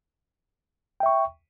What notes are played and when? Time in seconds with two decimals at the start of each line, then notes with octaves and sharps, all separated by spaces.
1.00 G5
1.03 E5
1.06 C#6